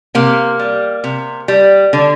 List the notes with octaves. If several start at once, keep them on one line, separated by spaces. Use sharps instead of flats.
C3 A#3
G3
C3
G3
D3